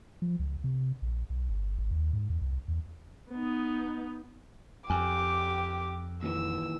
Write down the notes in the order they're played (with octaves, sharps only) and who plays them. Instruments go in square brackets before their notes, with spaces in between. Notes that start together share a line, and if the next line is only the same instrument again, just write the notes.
[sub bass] F3
C#2
C3
A#1
B1
G1
G#1
D#2
G#2
E2
C2
E2
[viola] B3 D#4
[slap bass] F2 [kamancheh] G4 D6 [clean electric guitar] G#5
[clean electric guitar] D#2 A#2 E3 [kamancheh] E6